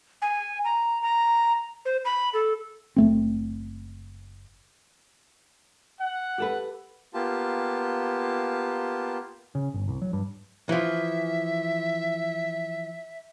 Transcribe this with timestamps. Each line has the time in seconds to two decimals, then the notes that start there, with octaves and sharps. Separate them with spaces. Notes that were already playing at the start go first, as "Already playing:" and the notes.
0.22 G#5
0.65 A#5
1.02 A#5
1.85 C5
2.05 B5
2.34 A4
2.96 F#1 A3 C4
6.00 F#5
6.38 G4 A4 B4
7.14 A#3 B3 F4 G4 A5
9.55 C#3
9.74 G1
9.88 C2
10.02 F#3
10.13 G2
10.69 E3 F3 E5